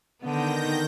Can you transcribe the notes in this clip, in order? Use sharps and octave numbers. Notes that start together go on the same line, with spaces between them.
D3 D#3 B3 G6 A#6